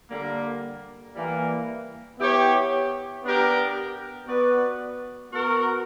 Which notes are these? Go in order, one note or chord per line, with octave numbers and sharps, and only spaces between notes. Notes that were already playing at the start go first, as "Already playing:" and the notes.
D3 G3 A#3
E3 G3 A#3
B3 E4 G4 C#5
B3 D4 G4 A#4
B3 F#4 B4 D5
B3 F#4 A#4